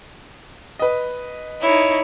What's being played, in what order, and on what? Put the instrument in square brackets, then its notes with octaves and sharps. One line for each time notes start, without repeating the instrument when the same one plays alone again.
[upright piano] B4 D#5
[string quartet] D#4 E4 C#5